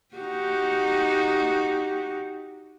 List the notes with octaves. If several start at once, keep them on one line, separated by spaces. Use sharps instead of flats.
D#4 F#4 G4